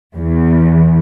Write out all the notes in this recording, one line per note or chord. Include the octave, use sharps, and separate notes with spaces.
E2